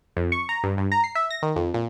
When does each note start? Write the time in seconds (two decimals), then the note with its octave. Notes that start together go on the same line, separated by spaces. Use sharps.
0.17 F2
0.32 C#6
0.49 A#5
0.63 G2
0.77 G2
0.92 A#5
1.04 C7
1.15 E5
1.31 A#6
1.43 D#3
1.56 F2
1.74 A#2